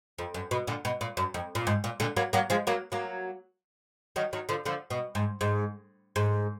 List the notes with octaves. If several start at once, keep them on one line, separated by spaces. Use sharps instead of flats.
F2
F#2
B2
A#2 D3
B2
A#2
F#2
F2
A#2
G#2
A#2
A#2 D3
F#3 A#3
F#3 A#3
F3 G#3
F#3 A#3
F#3 A#3
D#3 F#3
D#3 F#3
D3 F3
D3 F3
B2
G#2
G#2
G#2